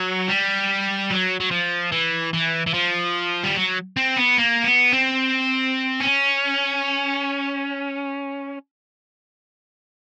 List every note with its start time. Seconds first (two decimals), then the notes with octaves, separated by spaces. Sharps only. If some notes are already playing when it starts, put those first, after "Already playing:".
Already playing: F#3
0.29 G3
1.10 F#3
1.40 F#3
1.51 F3
1.92 E3
2.33 E3
2.67 E3
2.74 F3
3.44 G3
3.56 F#3
3.97 C4
4.16 B3
4.38 A#3
4.64 B3
4.92 C4
6.00 C#4